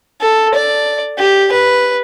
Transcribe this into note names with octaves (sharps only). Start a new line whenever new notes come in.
A4
D5
G4
B4